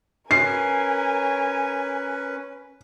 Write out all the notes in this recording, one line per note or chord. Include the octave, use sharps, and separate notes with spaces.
C#4 A#4 B4 G#5 C7